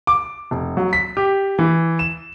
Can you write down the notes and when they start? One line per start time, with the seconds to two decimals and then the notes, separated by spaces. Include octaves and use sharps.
0.07 D6
0.51 F1
0.77 F#3
0.93 B6
1.17 G4
1.59 E3
1.99 E7